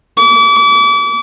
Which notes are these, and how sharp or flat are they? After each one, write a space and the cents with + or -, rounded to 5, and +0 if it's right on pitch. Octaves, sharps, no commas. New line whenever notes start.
D6 -35